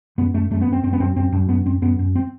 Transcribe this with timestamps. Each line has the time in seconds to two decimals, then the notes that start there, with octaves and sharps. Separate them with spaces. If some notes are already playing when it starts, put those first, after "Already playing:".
0.18 F#2 B3
0.34 F#2 A3
0.51 F#2 A3
0.61 B3
0.68 F#2 C4
0.83 F#2 C4
0.93 B3
1.00 F#2 C4
1.16 F#2 C4
1.32 F#2
1.49 F#2 B3
1.66 F#2 C4
1.82 F#2 B3
1.99 F#2
2.15 C4